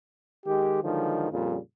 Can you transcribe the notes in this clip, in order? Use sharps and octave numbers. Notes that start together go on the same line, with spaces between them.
D#3 G#3 G4
D3 D#3 F3 F#3 G#3
F2 A#2 C#3 G3